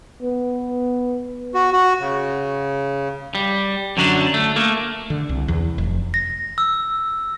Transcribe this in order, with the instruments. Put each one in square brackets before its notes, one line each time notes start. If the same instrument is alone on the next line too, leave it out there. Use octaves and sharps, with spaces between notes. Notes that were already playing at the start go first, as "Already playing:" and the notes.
[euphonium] B3
[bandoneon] F#4
F#4
C#3
[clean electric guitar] G3
F#2 D3 F#3 D4
A3
A3 A#3
[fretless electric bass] D3
C2
E2
F1
[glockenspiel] A#6
E6